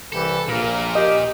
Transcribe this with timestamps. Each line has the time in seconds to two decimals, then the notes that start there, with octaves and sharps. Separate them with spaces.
0.12 C2 E3 G4 A4
0.48 A#1 A#2 A#3 A#4
0.95 G4 D#5